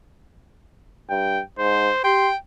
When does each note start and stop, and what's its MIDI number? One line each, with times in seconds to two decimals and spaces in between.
1.10 1.39 43
1.10 1.43 79
1.59 1.90 44
1.59 2.02 72
2.04 2.30 67
2.04 2.36 79
2.04 2.29 84